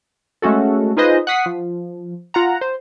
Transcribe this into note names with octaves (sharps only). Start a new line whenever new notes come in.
G#3 A3 C#4 F#4 A4
D#4 F4 G#4 B4 C5 D#5
F#5 C#6 D#6 B6 C7
F3
F4 F#5 A#5
C5